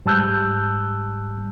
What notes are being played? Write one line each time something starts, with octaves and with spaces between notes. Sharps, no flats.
G#2 G3 A5 E6 F#6 G6